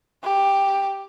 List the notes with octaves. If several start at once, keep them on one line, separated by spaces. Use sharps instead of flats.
G4